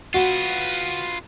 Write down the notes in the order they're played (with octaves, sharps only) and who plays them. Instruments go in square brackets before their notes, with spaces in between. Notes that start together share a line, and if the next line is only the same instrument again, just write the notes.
[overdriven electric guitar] F4 B4 [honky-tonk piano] F#4